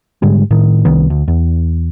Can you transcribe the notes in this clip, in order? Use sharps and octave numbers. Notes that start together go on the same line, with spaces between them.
G#2 D3 G3 G#3
A2 D#3
C2 D#3 B3
D2
E2